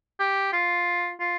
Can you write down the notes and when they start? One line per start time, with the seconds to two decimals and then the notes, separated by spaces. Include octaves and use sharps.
0.20 G4
0.53 F4
1.20 F4